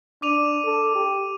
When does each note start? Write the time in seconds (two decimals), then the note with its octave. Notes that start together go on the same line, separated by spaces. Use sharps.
0.22 D4 D6 D#7 F7
0.65 A4
0.95 G4